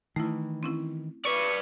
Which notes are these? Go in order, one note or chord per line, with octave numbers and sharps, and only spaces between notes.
D#3 E3 A3 E4
C4 C#4 E4
B4 D5 C#6